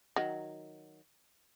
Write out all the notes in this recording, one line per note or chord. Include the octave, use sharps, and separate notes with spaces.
D#3 F#3